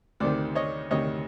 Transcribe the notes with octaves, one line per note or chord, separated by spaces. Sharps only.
D2 C3 D#3 C5 D5
C#5 D#5
D2 C3 D#3 C#5 D#5